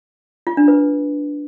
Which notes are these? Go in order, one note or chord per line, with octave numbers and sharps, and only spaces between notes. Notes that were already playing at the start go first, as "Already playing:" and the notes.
F4
D4
B4